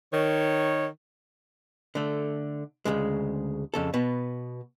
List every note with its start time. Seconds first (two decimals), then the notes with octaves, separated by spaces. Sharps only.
0.12 D#3 C#5
1.95 D3 A3
2.85 D2 G2 C#3 G#3
3.74 F2 C#3 A4
3.94 B2 B3